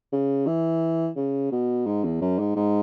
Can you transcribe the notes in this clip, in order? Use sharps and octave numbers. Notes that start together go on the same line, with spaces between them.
C#3
E3
C#3
B2
G#2
E2
F#2
G#2
G#2